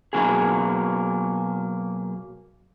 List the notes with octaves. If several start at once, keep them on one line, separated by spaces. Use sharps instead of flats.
B2 F#3 G#3 A#3 F#4 G#4